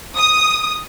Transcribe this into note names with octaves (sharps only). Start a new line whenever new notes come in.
D#6